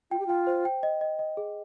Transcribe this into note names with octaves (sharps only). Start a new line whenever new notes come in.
F4 G5
G4
F4 G5
C5
G5
D#5
D#5
D#5
G#4